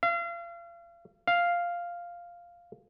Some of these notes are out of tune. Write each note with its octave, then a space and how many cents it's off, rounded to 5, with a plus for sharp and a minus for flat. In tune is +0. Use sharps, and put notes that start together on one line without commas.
F5 -35
F5 +0